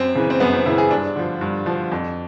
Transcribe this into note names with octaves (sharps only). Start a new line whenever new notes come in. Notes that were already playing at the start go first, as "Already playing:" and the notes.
Already playing: F#2 C4
C#3 E3
C4
F#2 B3
C4
C#3 E3 E4
G#4
G2 D4
D3 F3
G2
D3 F3
F2